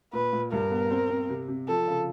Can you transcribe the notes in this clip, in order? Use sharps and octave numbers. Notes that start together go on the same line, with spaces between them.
A#2 B4
A#2
G2 A#4
B3
C4
C4
C3
C3
F3 A4
C#3